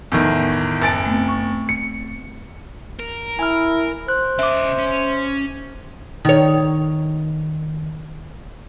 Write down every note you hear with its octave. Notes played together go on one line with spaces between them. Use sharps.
E2 A2 D#3
F#1 G#5 A5 A6 D7
A3 B3 C4
C#6
C#7
A#4
E4 G#5 F6
C5 F#6
C#3 D#5 E5 D6
C#4
D#3 C#5